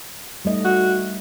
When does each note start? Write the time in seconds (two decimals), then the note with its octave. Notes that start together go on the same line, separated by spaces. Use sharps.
0.45 G3 A3 D#5
0.65 F#4